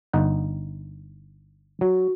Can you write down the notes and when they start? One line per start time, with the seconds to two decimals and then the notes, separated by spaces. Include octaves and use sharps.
0.13 G1 D#4 F#5
1.81 F#3 F#4